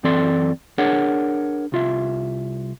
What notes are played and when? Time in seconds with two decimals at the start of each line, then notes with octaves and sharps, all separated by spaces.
0.03 F#2 E3 C4 A4 D5 C6
0.78 D4 G#4 A#4 C#5 F#5
1.72 C2 F4 E5